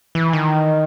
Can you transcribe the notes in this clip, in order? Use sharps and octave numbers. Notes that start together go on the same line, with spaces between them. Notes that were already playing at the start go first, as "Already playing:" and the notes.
E3
D#3